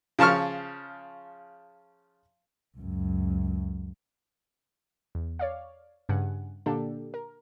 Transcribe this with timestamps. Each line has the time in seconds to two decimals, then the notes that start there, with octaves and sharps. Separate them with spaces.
0.19 C#3 F3 A5 C#6 F6
2.78 C#2 F#2
5.15 E2
5.39 C#5 D5 F5
6.09 G2 C#3 F#5 G#5
6.66 A#2 D3 A#3 D4 G4 A4
7.14 A#4